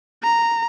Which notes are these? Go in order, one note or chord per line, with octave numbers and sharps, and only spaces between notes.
A#5